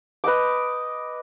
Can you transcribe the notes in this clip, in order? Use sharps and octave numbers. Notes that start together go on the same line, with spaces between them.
B4 D#5 G5 D6